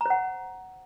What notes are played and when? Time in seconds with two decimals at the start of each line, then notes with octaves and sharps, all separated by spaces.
0.01 A#5
0.06 C5
0.10 F#5